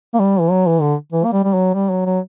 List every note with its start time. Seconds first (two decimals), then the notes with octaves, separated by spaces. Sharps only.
0.14 A#3
0.20 G3
0.40 E3
0.51 F#3
0.67 E3
0.81 D3
1.12 E3
1.25 A#3
1.33 G3
1.44 G3
1.54 F#3
1.74 G3
1.90 F#3
2.06 F#3